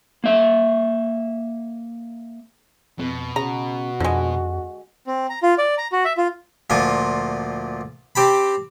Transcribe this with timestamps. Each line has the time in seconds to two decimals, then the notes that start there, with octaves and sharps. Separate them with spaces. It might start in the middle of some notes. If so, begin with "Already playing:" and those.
0.24 A#3 E5
2.99 F2 B2
3.36 C#3 F#4 A#5
4.00 F2 D3 G#3
5.07 C4
5.29 A#5
5.43 F4
5.58 D5
5.78 A#5
5.92 F#4
6.05 E5
6.17 F4
6.70 D2 A#2 F3 F4 G#5
8.15 C4 G4 A5 B5